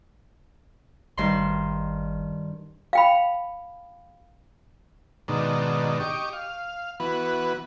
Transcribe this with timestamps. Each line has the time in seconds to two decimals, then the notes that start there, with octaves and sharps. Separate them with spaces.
1.17 G#1 G2 D#3 C6
2.93 F5 G5 B5
5.28 G#2 B2 D#3 D4
6.00 G4 D#5 C#6 D6
6.33 F5
7.00 E3 B3 F#4 B4